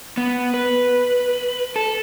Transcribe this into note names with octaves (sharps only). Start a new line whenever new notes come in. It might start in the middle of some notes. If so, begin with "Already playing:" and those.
B3
B4
A4